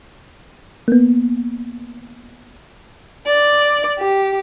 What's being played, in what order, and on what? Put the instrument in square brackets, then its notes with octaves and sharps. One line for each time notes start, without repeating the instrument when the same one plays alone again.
[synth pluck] A#3 B3
[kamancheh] D5
G4